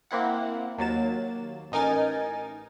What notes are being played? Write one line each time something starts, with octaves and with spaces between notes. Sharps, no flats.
A#3 C4 E4 F#5
D#2 F#3 A#3 A6 E7
A1 D#4 A#4 G#5 A6